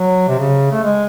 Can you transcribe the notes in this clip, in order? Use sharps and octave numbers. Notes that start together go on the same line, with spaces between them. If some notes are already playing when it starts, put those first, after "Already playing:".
Already playing: F#3
C3
C#3
A3
G#3